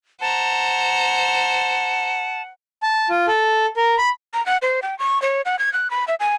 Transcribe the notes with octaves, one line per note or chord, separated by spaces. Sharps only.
C5 F#5 A5 A#5
A5
F4
A4
A#4
B5
A#5
F#5
C5
G5
C#6
C#5
F#5
G#6
F#6
B5
E5
G#5